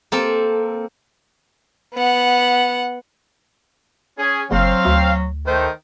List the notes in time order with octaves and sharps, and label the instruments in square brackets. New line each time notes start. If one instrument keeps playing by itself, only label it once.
[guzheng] A#3 C4 A4
[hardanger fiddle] B3 F#5
[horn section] C#4 G#4
[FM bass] F#1 [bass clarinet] F#3 [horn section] C4 F5
[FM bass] D2
[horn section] D#3 A3 D#4 [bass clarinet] C5